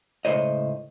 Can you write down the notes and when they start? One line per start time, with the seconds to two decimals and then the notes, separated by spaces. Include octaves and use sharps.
0.25 C#2 A2 C5 D#5